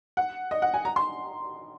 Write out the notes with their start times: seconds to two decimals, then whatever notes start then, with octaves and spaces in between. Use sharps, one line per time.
0.17 F#5
0.51 D#5
0.62 F#5
0.74 G#5
0.85 A#5
0.96 C6